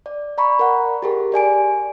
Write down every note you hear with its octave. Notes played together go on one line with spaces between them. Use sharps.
D5
D5 A#5 B5 C#6
A#4 F#5
G4 G#4 A#4
G4 D5 G#5 D7